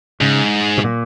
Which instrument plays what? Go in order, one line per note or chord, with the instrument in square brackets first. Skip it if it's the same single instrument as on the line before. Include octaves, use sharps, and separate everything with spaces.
[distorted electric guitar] G#2 [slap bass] C#3
[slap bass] B2
A#2